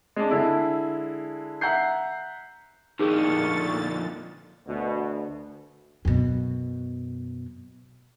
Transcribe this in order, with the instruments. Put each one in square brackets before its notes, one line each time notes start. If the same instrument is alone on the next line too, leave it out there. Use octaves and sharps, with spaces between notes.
[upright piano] G#3 D4
D3 G#3 E4
E5 F#5 A#5 G6 C7
[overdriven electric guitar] F2 D#3 [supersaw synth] A#2 D3 A6 [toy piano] D#4 G#4 [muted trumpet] C#6
[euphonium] D2 [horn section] B2
[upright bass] F#2 B2